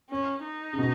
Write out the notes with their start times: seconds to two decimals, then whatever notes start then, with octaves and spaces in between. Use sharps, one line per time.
0.10 C#4
0.44 D#4
0.73 C#3
0.78 B2